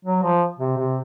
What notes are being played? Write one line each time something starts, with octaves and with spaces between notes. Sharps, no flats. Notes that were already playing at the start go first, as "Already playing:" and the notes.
F#3
F3
C3
C3